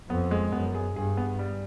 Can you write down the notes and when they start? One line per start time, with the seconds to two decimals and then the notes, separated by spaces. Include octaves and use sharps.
0.09 F2 B3
0.31 G#3
0.52 F#2 B3
0.75 G#4
0.96 G2 G#4
1.17 B3
1.39 G3